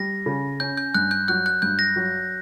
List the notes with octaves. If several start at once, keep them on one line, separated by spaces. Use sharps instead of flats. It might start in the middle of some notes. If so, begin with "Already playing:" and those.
Already playing: G3 A#6
C#3
C#4 G6
G6
G2 F#6
G6
F#3 F#6
F#6
G2 G6
A#6
F#3